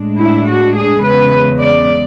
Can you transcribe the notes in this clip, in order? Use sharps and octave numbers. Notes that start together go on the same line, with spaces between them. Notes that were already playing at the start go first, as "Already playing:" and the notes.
Already playing: A2 G#3 D4
E4
F#4
G#4
E2 C#3 G#3 B4
D5